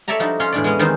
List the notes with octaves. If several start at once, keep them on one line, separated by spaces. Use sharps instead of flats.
A4 C#5 D5 E5 A5 A#5
F3 G3 D4 D#4 F#4
C#4 F4 C#5 C6
E2 A2 D4 D5
G#3 B3 C#4
E2 D#3 C4 D#4 C5